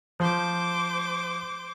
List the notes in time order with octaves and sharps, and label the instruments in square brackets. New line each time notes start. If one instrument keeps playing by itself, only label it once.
[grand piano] F3 [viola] C5 D6